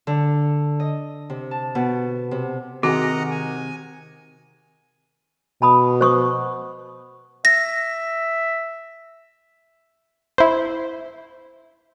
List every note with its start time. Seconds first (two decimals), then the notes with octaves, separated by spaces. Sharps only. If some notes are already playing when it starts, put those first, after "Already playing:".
0.07 D3
0.80 D#5
1.30 C3
1.51 A5
1.75 B2
2.31 C3
2.83 C3 D#3 F#4 G#4 D#5 F#5 A#5
3.31 G#5
5.62 B2 A5 B5 D#6
6.01 C5 C#6 D#6
7.45 E5 A#6
10.38 E4 C5